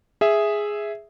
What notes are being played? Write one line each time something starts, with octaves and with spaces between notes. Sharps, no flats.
G#4 E5